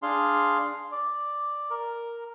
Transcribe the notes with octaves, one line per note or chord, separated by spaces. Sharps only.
D4 G#4 F5 C6
D5
A#4